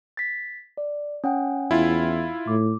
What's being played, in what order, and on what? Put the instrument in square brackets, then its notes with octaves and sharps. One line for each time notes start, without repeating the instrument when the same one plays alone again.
[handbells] A6 B6
D5
C#4 F#5 G5
[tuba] E2 [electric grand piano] E4 F4
[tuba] A2 [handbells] D6